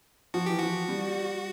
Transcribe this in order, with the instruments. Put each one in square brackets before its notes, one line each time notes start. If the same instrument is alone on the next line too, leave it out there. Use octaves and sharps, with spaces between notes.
[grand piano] F3 [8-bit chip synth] F#4
[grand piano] E3 [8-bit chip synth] G4
[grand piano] F3 [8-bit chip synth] F#4
[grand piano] G3